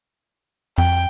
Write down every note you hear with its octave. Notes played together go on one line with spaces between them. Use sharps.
F2 G5